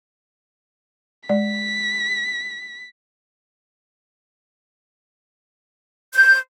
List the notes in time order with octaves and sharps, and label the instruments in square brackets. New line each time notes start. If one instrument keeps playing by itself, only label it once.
[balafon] G#3 D5 [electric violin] B6
[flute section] G6